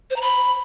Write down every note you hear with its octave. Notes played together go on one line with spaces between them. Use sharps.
C5
A#5
B5